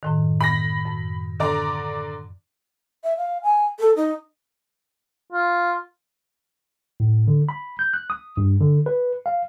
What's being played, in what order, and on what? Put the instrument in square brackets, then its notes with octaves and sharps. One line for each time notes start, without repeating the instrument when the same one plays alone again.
[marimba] F#2 A2 D#3
[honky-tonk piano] B5 A#6
[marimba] F#2
[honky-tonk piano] D3 D5 A#5
[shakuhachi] E5
F5
G#5
A4
D#4
[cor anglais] F4
[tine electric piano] A2
D3
B5
G6
F#6
D#6
G2
D3
B4
F5